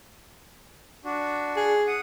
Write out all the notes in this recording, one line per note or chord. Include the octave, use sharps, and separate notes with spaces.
D4 F#4
G#4
F#5 D#6